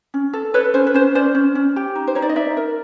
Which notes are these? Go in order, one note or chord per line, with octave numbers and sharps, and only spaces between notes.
C#4
A4
A4 B4 C#5
C#4 C5
B4
C#4 C5
C#4 C5 D5
C#4
C#4
G4
D#4
C5
D#4 C#5
D5
D#5
D#4 D5 E5
A#4